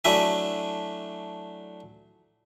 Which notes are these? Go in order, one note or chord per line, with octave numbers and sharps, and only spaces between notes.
F#3 A3 D4 E4 E5 G#5